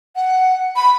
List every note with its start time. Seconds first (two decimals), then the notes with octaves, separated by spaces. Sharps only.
0.16 F#5
0.76 B5